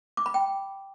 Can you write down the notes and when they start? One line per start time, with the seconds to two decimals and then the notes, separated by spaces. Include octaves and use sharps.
0.17 D6
0.26 B5
0.34 G5